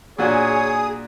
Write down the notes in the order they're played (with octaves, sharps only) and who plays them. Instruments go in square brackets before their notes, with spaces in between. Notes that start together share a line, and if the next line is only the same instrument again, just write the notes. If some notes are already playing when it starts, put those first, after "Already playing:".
[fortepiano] A#2 D4 F#4 [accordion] G#4 D#6 [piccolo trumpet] C#5